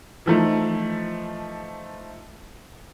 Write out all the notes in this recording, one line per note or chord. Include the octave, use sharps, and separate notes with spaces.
E3 F3 A3 D#4